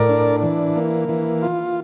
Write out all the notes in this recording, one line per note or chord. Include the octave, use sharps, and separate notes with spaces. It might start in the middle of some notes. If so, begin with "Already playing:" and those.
Already playing: A2 A#4 D5
D4
E3
A#3
E3
F4